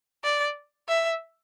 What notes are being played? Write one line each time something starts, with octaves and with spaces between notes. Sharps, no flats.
D5
E5